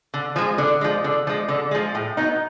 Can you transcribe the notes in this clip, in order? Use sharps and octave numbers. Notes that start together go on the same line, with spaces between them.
D3
F3 G#3
D3
F3 G#3
D3
F3 G#3
D3
F3 G#3
A2
F#3 B3 D#4